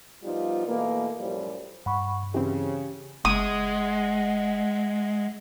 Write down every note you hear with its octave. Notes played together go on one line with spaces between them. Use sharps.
F3 G3 B3 D#4 F4
B2 E3 A3 A#3
F#2 A2 F3 G3
G2 F#5 B5 C#6
C#3 E3 C4 G4
F#1 G#3 D#5 E5 F#5 D#6